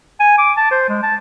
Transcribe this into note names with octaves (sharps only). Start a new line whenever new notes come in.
G#5
D6
A5
C5
G#3
A5